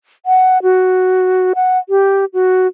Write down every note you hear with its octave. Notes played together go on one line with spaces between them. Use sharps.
F#5
F#4
F#5
G4
F#4